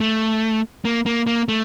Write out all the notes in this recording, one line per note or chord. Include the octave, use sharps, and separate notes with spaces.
A3
A#3
A#3
A#3
A3